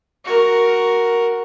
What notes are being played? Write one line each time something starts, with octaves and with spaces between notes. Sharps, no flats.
F#4 A#4